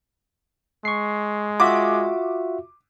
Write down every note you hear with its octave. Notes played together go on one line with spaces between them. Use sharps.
G#3 C#6 C7
F4 F#4 E5 D6